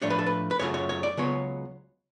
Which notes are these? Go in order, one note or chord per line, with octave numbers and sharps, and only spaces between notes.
A2 F3 A3 D4 C#5
B4
A4
B4
B4
F#2 C#3 F#3 A3 F4 C#5
C#5
C#5
D5
C#2 C#3 F#3 B3 F4 C#5